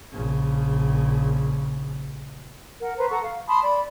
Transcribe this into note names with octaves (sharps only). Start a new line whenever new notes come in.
A#1 C#3
A#4 F#5
B4 C5 A#5
A4 F#5 A#5 C#6
F5
A5 B5 C6 D#6
D5 B5